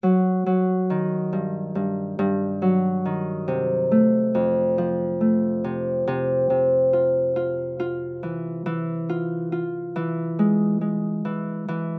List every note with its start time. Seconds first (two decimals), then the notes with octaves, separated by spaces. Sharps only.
0.03 F#3
0.46 F#3
0.90 D#3
1.33 G2
1.75 G2
2.19 G2
2.62 F#3
3.05 D#3
3.48 C3
3.91 A3
4.35 F2
4.78 F3
5.21 A3
5.64 C3
6.07 C3
6.50 C3
6.93 F4
7.36 F4
7.80 F4
8.23 E3
8.66 E3
9.09 F4
9.52 F4
9.96 E3
10.39 G#3
10.81 G#3
11.25 E3
11.68 E3